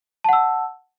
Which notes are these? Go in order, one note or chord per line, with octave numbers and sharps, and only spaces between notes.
F#5 A5 E6